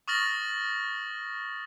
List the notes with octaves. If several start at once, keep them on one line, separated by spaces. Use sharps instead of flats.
C#6 D#6 F6 A6 A#6 F#7